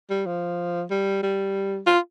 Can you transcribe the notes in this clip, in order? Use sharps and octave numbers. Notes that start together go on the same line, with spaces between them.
G3
F3
G3
G3
F4